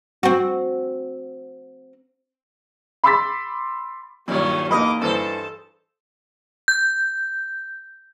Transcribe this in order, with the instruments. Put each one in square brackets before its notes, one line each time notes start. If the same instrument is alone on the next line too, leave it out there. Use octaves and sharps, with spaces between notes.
[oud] C4 F#4
[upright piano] B5 C6 D6 E6 A6 B6
[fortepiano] G2 A#2 [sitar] D#3 F#3 [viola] G4 C#5
[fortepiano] E2 A#3 D#4 [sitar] D#5 [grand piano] B5 D#6 [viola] D6
[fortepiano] G2 E3 [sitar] A4 C5 [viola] A5
[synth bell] G6